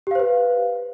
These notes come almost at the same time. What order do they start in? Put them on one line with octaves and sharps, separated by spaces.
G4 F5 C5 B4